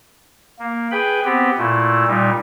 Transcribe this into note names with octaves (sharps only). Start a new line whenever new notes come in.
A#3
G#4 B4 G5 B5
B3 C4 G4
A#2 A3 E4
A#2 G3 D#4